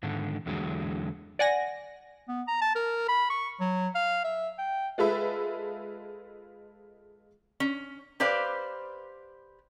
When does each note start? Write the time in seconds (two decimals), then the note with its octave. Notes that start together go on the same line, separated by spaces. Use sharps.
0.03 G#2 D3 D#3
0.46 E2 D3 F#3 G#3
1.39 D5 F#5 G#5 A#6
2.28 B3
2.47 A#5
2.61 A5
2.75 A#4
3.08 B5
3.30 C#6
3.60 F#3
3.95 F5
4.24 E5
4.58 G5
4.98 G#3 F4 G#4 A4 B4 E5
7.60 C#4
8.20 G4 B4 C5 D5 F5